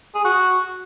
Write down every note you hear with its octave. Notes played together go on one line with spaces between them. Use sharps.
G#4
F#4